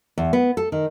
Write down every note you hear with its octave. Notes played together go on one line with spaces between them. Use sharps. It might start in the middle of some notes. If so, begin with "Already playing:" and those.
E2
B3
A4
D#3